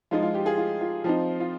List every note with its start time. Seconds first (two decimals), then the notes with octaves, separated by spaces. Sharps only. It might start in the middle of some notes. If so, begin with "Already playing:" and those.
0.11 F3 G#3 D#4 F4
0.23 F4
0.34 G4
0.46 F4 G#4
0.58 F4
0.81 F4
1.04 F3 C4 D#4
1.40 F4